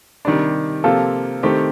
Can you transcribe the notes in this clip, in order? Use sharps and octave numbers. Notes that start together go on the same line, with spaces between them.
C3 D#3 G3 D4
C3 F3 A#3 F4 A4
D#3 A3 C4 G4